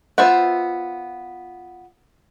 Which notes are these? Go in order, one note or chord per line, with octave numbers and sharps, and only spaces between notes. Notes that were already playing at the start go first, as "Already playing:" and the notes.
B3 F4 C5 E5 F#5